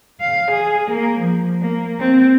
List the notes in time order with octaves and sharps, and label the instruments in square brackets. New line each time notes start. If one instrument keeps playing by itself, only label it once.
[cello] F5
G#4
A#3
F3
A#3
C4